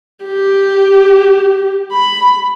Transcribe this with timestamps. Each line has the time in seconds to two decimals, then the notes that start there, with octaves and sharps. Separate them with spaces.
0.25 G4
1.92 B5